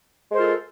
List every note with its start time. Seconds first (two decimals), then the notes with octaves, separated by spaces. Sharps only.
0.31 G#3
0.34 C5
0.37 A#4
0.39 F4
0.42 A4